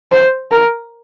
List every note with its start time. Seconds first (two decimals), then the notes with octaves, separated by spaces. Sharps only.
0.12 C5
0.51 A#4